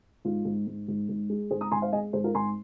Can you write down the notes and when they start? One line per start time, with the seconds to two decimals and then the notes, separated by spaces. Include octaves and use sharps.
0.25 G#2 F4
0.45 G#2
0.67 G#2
0.88 G#2
1.09 G#2
1.30 G#3
1.51 G#2 G#4 C5
1.61 A#5 D#6
1.71 G#2 G#5 C6
1.82 C5 F5
1.92 G#3 D#5 G#5
2.13 G#2 G#4 C5
2.24 F4 A#4
2.34 G#2 G#5 C6